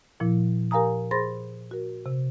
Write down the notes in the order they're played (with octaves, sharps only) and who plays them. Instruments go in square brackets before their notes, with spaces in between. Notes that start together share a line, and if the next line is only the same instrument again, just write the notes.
[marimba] A#2 F3 E4
G4 A#4 F5 G#5 A#5 D#6
G#4 C5 B5 C6 A6 A#6
F#4 A#4
C3